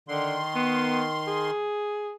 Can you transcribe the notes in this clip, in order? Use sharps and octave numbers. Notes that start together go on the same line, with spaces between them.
D3 D#3 C6
B3
G#4